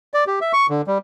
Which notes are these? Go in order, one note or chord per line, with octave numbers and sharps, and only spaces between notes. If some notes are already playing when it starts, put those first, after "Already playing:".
D5
G4
E5
C#6
D3
G3